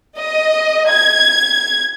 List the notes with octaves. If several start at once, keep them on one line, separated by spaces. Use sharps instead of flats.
D#5
G#6